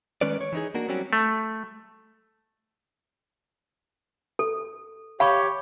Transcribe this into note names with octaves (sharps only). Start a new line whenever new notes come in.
D#3 G#3 C#4 B4 D5
C#5
E3 D#4 G#4
A#3 D4 F#4 A#4
F#3 G3 C4 C#4 F#4 G4
A3
A4
G4 C#5 F5 B5 C#6